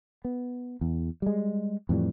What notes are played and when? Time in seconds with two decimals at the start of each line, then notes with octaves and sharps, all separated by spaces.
0.25 B3
0.81 E2
1.22 G3 G#3
1.89 F2 A2 E3 G3